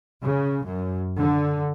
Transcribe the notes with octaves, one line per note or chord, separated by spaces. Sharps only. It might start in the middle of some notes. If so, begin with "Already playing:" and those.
C#3
F#2
D3